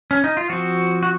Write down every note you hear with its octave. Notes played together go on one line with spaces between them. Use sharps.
C#4
D#4
F4
F3 C4 F#4
F#4